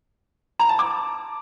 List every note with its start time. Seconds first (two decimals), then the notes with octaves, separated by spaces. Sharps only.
0.59 A#5
0.69 A5
0.79 D6